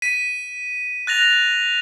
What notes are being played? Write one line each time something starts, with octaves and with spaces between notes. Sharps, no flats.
B6 D#7
F#6 A6 A#6 F7